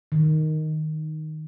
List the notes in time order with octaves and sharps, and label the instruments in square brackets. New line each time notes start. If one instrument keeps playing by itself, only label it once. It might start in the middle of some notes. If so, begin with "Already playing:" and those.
[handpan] D#3